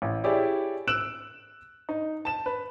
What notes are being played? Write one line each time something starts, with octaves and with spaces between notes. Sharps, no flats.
A1
E4 G4 G#4 C#5 D5
E6 F#6 D7 E7 F#7
D#4
A5 E7
B4